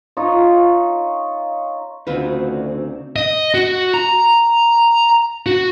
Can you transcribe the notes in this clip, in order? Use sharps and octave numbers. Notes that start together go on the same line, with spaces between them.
D#4 F4 C#5
D2 C#3 C4 D#4 F4 F#4 B4
D#5
F#4
A#5
F#4